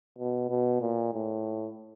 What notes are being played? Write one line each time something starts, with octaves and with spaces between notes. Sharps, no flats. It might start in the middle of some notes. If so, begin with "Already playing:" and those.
B2
B2
A#2
A2